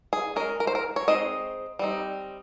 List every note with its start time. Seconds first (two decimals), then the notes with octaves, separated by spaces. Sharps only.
0.13 G#4
0.36 G#3 C#4 A#4
0.60 A#4
0.67 C5
0.75 A#4
0.96 C#5
1.08 G#3 C4 D#4 D#5
1.79 G3 C4 D#4